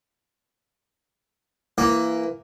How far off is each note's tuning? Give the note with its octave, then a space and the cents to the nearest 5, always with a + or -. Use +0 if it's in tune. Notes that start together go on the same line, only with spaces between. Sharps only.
E3 +20 A#3 +0